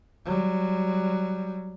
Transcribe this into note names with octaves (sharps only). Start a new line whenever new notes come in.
F#3 G3